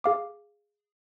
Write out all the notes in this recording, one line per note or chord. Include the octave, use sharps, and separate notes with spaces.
G#4 F5 D6